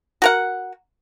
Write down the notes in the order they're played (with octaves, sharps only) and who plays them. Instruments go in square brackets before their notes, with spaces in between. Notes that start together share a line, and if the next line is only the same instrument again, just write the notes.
[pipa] F#4 A#4 F#5